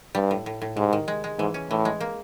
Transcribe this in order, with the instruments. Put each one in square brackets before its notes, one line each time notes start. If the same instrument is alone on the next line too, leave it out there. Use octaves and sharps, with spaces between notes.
[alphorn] G2 [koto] G3
[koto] A2
A2
A2
[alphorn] G#2 [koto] C3
[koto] D#3
G#3
G#3
[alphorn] G#2 [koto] E3
[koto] C#4
[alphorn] A2 [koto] E3
[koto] G#3
A#3